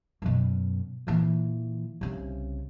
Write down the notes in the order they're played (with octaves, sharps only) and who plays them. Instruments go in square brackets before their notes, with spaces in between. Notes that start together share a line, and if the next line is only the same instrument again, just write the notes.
[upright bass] F#2 B2
A#2 E3
C2 C#3